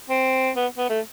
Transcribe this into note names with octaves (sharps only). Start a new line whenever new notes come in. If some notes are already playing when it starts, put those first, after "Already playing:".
C4
B3
B3
A3